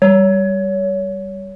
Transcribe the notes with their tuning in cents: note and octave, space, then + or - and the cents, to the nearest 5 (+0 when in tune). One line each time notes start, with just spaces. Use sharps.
G3 +0 C#5 +25